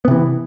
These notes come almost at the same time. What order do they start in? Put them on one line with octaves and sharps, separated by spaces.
B3 C3 E3